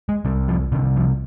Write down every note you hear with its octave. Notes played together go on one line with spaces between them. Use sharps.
G#3
C2 C3 G3
F3
C2 C3 D#3
F3